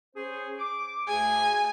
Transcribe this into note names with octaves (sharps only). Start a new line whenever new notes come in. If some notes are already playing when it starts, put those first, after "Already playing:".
C#4 G#4 C5
D6
D2 G#4 G#5